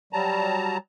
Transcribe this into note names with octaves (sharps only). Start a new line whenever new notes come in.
F#3 G3 A5 A#5